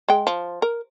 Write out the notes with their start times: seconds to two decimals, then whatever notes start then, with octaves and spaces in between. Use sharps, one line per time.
0.08 G#3 G5
0.27 F3
0.62 A#4